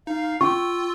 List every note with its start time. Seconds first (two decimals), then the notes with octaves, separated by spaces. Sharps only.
0.07 D#4 F5
0.41 F4 G5 C#6 E6